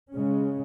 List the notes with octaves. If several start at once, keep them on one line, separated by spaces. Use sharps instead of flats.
C#3 G#3 C#4